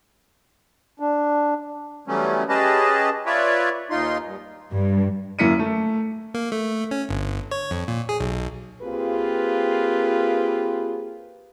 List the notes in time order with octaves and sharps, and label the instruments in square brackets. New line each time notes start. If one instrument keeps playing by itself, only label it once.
[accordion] D4
E3 F#3 G3 A3 B3 C#4
C#4 G4 G#4 B4 D#5 A5
F4 B4 C#5 D5 E5
D#2 D#4 F4 C6
G2
[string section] G2
[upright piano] F#2 A#3 E4 B6 C#7 D#7
A3
[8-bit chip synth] A#3
A3
C#4
G1
C#5
F2
A#2
G#4
B1
[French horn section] A#3 C4 F4 G4 G#4 B4